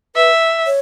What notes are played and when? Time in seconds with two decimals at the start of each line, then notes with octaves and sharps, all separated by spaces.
0.16 B4 E5
0.66 C#5